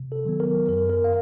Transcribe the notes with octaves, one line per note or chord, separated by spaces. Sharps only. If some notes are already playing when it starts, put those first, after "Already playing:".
Already playing: C3
A4
D#3 F#3 B3
A#4
F#2 A#4
A#4
F5